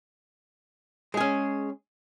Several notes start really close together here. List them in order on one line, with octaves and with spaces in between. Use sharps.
G#3 G#4 C#4